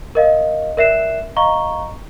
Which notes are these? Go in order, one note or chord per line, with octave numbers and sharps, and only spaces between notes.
A#4 D#5 F5
A#4 D5 E5 F#6 C7 E7
D#5 F5 A#5 C#6 G7